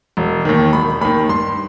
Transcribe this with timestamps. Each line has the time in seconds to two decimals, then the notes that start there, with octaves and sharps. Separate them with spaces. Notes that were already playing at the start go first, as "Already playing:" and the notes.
0.17 E1
0.45 D#2 D#3
0.73 E1 B5
1.01 D#2 D#3 B5
1.29 G2 C6